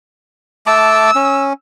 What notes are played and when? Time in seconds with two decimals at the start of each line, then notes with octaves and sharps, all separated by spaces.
0.67 A3 A5 D6 E6
1.15 C#4